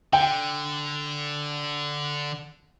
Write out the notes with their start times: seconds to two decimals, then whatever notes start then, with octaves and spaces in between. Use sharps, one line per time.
0.13 D3 G5